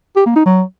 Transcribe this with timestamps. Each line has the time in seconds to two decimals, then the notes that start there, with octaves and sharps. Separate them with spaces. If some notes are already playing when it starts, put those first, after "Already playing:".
0.16 G4
0.26 A#3
0.36 D#4
0.45 F#3